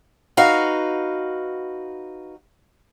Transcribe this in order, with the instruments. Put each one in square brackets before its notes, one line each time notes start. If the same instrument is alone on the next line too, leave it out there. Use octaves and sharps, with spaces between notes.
[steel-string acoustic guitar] D#4 F#4 B4 F5